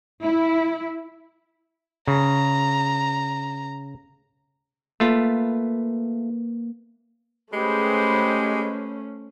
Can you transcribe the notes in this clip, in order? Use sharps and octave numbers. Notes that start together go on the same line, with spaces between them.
E4
C#3 A#5
A3 A#3 F4 B4
G#3 A3 C#4 G4 G#4 B4 C5